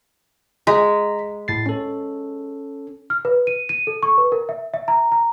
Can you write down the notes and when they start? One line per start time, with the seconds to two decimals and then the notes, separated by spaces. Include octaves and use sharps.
0.67 G#3 A#5 B6
1.48 A2 A6 C7
1.66 C#4 A4
3.10 F6
3.25 B4
3.47 D#7
3.69 D#7
3.87 A4
4.03 C#6
4.18 B4
4.32 A#4
4.49 E5
4.74 E5
4.88 A#5
5.12 A#5